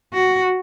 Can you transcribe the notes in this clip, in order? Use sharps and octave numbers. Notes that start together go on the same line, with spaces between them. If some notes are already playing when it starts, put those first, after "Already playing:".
F#4